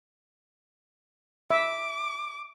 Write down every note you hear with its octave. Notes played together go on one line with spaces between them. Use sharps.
E5 D6